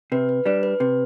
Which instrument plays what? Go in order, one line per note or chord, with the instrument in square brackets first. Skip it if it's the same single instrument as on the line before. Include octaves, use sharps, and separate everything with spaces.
[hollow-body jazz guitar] C3 [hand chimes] B4
[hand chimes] B4
[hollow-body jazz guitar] G3 D4 [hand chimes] B4
[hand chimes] B4
[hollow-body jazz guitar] C3 [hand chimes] B4